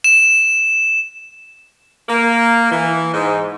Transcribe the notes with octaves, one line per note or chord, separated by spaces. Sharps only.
E7
A#3
E3
G#2